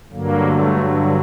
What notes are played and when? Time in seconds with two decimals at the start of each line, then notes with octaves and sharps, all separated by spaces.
0.12 G2 D3 F#3 A#3
0.46 A3